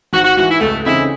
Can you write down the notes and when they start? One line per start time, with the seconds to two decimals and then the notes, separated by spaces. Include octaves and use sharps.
0.13 G#1 F#4
0.24 F#4
0.37 G#2 E3 F#4
0.49 E4
0.60 C#2 A3
0.85 C#3 E3 C4 D#4 E4